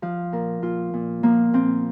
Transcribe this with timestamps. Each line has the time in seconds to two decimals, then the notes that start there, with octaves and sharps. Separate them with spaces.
0.02 F3 F5
0.32 A#2 A#4
0.62 A#2 F4
0.94 A#2
1.23 F3 A#3
1.53 A#2 C4